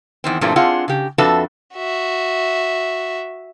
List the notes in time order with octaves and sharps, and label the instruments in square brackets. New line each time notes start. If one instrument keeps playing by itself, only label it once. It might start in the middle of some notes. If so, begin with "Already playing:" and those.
[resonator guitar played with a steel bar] E2 D#3 C4
G2 A#2 E3 G3 A3 C4
C4 D4 F4 G#4 F#5
C#3 G4
F2 D4 F#4 A4 B4 E5
[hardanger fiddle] F#4 E5